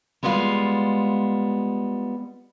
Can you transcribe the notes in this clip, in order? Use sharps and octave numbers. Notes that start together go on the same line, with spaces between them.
G3 G#3 B3 F4 F5